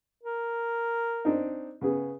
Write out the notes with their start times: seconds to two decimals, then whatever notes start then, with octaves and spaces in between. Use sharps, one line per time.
0.24 A#4
1.25 C4 D4 D#4
1.81 C#3 B3 G#4